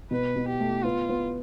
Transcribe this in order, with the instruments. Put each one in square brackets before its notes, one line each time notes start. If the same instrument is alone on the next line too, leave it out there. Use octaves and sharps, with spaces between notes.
[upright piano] B2 [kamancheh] B4
[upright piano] B2
[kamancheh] G4
[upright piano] A3
[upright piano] B3 [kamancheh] F4
[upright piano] B3